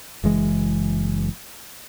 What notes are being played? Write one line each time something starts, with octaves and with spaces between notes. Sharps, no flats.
F#1 E3 G#3